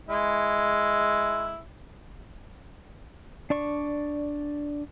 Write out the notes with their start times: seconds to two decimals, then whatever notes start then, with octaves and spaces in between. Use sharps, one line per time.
0.09 G#3 E4
3.50 D4 D5 C#6